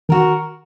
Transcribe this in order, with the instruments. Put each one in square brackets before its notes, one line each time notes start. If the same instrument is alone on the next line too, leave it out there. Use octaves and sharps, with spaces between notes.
[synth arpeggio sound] D#3 [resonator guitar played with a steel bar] F#4 A#4